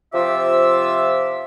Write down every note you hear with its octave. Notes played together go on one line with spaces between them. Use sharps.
C3 F3 F4 E5 D6 E6